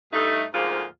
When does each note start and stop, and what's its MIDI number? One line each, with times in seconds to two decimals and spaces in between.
0.13 0.43 43
0.13 0.43 57
0.13 0.43 63
0.53 0.83 38
0.53 0.83 44
0.53 0.83 53
0.53 0.83 58
0.53 0.83 65
0.53 0.83 68